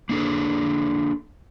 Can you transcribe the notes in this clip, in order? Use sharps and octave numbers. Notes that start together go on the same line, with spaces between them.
A#3 D4 G#4 A4